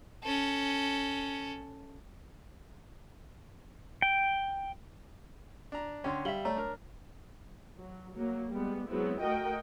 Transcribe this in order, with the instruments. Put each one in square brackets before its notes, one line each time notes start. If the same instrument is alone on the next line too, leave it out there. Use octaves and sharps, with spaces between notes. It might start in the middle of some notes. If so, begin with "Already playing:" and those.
[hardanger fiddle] C#4 A4
[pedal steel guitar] G5
[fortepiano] D4 A#5
[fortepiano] D3 C#4 [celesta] G5 C6
[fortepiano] G3 E5 [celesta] F5 F#7 G7
[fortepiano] A3 [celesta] C#5 D5 A#5
[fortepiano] D4 A#4
[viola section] F#3
F#3 A#3
G3 G#3 B3
F#3 G#3 B3 C4 E4
A3 F#4 A#4 D#5 G5